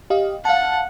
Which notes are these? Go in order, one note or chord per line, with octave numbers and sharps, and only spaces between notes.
G4 D#5 F5
F5 F#5 A5